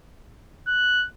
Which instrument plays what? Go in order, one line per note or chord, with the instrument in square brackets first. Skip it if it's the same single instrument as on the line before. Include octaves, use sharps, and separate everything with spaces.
[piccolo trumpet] F#6